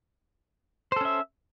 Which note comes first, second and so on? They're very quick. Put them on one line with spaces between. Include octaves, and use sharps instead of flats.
C5 A4 C#4 E5